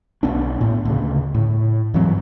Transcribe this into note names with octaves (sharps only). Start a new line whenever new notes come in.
B1 B3 D4
A2
D2 C#3
A2
G2 E3 F#3 C4